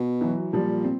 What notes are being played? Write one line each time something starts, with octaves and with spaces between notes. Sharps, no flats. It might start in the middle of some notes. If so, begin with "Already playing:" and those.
Already playing: B2
E3 F#3
A#2 F3 G3
C4